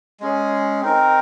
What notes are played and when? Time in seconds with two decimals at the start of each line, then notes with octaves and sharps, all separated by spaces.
0.20 G#3 C#4 G#4
0.81 C4 D#4 A#4